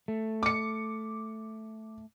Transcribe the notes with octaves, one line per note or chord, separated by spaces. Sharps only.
A3
D6 C#7